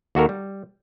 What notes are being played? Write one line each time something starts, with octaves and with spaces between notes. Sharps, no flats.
D#2 F#4 A4 A#4
G3